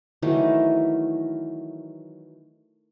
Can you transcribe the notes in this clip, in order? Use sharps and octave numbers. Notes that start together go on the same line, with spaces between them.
D#3 E3 F#3 A3